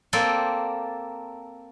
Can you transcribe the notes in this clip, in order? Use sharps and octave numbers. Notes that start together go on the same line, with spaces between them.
A#3 C4 A4 D5 G5 G#5